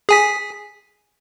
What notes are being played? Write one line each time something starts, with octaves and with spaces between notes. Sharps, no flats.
G#4 G#5 B6